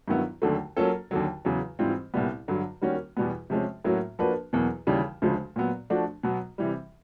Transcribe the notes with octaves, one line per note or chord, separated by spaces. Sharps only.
G2 D#3 F#3 B3 E4
D#2 D3 F#3 A3
F#3 A#3 C#4 F4 A4
D#2 D3 F#3
E2 C#3 F#3
G#2 E3 G3 C4 F4
C2 A#2 G3 B3
G2 D3 F#3
D#3 G3 A#3 C#4 F#4
E2 B2 G3 B3
C3 F3 G#3 C#4
A2 F#3 A#3 C#4 F#4
F3 A#3 D4 F#4 B4
E2 B2 F#3 A#3
D#2 C#3 E3 G3
D2 C#3 F3 G#3
A#2 F#3 B3
F3 A3 D4 F#4
B2 F#3 B3
C3 E3 G3